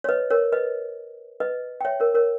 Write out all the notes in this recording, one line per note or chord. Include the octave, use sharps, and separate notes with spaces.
C#5
B4 D#5
A#4 C#5
B4 D#5
B4 D#5
G5
C#5 E5
A#4 C#5
A#4 C#5